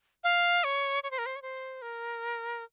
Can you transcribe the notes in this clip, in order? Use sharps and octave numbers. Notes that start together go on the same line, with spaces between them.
F5
C#5
C#5
C5
A#4
C5
C#5
C5
A#4